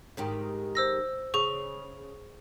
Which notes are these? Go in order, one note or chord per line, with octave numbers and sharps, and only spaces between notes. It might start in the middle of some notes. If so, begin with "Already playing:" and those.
G#2 D#3 G4
C5 E6 A#6
C#3 G#4 C#6